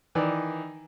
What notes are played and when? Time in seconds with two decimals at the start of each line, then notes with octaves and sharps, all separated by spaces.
0.15 D#3 E3 D5